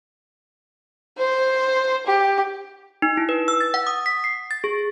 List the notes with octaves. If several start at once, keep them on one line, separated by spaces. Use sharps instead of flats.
C5
G4
D#4
E4
B4
E6
A6
F#5
D#6
B6
C7
A6
G#4